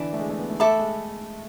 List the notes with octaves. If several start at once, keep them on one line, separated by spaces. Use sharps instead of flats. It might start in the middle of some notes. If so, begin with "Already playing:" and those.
Already playing: D3 E3 B4 D5 A5 D6
A3
G#3
A3
B3
A3
A3 A4 E5 B5 D6
G#3